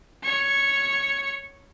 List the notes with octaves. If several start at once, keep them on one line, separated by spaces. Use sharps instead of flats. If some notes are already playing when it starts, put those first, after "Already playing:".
C#5 C#6